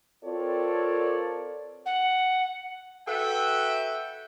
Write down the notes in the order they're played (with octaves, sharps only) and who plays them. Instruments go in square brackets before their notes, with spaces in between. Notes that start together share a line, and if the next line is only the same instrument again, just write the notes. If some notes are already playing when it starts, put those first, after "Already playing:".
[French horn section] C4 F4 A4 A#4 C#5 D5
[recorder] F#5
[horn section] F#4 A4 B4 E5 G5